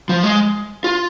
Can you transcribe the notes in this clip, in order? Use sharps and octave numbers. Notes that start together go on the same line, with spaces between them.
F3
G#3
F4